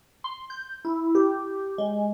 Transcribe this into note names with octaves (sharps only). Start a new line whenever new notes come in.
C6
G6
E4
G4
G#3